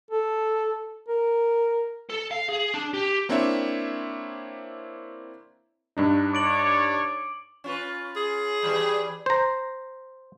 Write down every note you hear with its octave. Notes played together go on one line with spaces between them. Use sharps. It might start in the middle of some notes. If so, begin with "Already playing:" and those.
A4
A#4
A4
F5
G#4
D4
G4
A#3 C4 D4 E4 C#5 E5
G2 D4 D#4
C#5 D5 D6 D7 F#7
C#4 F4 B4
G#4
E3 G3
C5 A#5